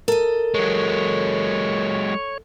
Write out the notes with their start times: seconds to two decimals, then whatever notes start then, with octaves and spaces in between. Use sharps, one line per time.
0.08 A4 A#4 D#5
0.54 F#3 G#3 C#5